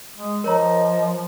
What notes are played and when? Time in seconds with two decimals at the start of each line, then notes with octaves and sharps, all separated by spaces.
0.17 G#3
0.44 F3 A#4 C#5 D#5 A#5